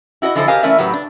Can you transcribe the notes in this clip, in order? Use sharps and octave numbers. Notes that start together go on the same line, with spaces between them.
E4 F#4 A4 D#5
D3 E3 F3 E4 A4 C5
G4 A#4 C5 D#5 F5 G#5
E3 A3 C#4 A#4 D5 E5
A2 F#3 G4 B4
D4